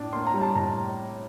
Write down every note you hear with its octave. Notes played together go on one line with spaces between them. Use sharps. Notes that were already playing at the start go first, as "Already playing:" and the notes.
Already playing: A2 D4
A#3 C6
A#5
G3
A5
A2 A#5